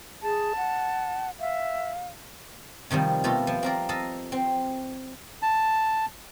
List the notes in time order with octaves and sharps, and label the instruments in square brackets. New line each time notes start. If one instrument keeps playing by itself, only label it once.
[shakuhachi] G#4 [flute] A5
[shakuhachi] F#5
[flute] E5 [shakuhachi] F5
[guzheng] C3 D#3 F3 G3
B2 A3 F4 G4 A4
F3
C4 A#4 D5
A4 D#5 F5 A5 A#5
C4
[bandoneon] A5